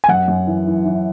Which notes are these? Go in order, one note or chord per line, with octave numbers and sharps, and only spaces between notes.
G#5
F#2 F#5
F#2
E3
E3
E3